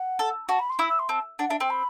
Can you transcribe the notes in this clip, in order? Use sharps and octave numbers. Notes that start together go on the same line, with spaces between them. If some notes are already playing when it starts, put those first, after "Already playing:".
Already playing: F#5
A4
F#4 A5
B5
C6
E4 E6
E6
C6
C4 A5
D4 F#5
D4 E5
C4 G5
B5